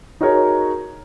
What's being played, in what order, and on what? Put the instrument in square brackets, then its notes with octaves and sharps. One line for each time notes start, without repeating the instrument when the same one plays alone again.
[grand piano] D#4 F#4 G#4 A#4 C#5